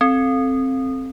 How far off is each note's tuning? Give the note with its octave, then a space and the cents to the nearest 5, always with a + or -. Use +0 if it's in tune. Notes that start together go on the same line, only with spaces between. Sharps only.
C4 +10 A4 -5